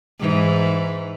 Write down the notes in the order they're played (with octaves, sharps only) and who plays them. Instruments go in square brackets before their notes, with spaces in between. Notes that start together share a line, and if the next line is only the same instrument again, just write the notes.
[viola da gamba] G#2 E3